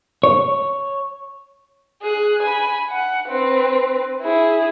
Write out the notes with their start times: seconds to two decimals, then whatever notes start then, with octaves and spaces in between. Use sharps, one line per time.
0.23 C#5
2.02 G#4 F#6
2.42 G#5 B5
2.89 F#5
3.28 C4 B4
4.22 E4 G#4